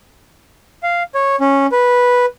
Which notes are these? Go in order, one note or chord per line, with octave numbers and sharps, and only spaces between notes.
F5
C#5
C#4
B4